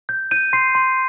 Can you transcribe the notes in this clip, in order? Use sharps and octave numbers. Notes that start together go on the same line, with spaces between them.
G6
G6 D#7
C6 C7
C6